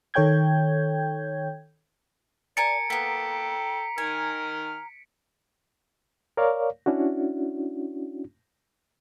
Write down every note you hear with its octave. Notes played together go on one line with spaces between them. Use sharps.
D#3 A4 C#5 G5 G6 G#6
A#4 D5 G#5 A5 C#7 D7
A#3 B3 A4 G5 A#5 B6
D#3 A#4 G#5 F6
A#4 C#5 D5 F5
C#4 D4 E4 F#4